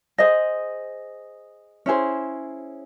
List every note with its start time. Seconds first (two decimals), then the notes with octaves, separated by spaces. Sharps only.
0.18 G#4 C5 D#5
1.86 C#4 E4 G#4 C5